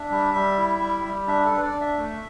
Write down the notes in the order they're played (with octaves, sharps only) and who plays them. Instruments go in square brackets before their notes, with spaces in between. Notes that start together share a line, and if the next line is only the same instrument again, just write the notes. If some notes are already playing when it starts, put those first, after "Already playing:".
Already playing: [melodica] D4 E5
G3
G3
E4
G3
G3
D4 E5
A4
D4
B4
D5
D4
E5
A3